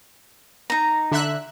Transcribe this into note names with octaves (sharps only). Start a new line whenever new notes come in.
D#4 A#5
D3 E5 F#6